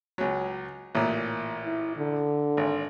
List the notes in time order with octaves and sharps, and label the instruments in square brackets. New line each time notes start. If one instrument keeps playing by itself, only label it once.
[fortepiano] C#2 F#3
A1 A#2
[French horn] E4
D3
[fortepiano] G#1